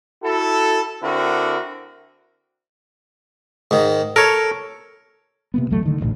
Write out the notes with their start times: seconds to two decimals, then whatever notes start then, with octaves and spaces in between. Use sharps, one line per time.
0.23 E4 F#4 A4
1.03 D3 C4 E4 F#4 A#4
3.71 G#2 D#3
4.16 A4 A#4 C#5
5.54 C3 A#3 B3
5.70 A1 D2 F#3 A3
5.85 D3 D#3
6.01 D#1 A1 D2 A2